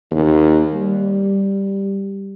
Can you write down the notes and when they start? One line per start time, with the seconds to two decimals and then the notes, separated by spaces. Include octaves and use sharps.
0.11 D#2
0.74 G3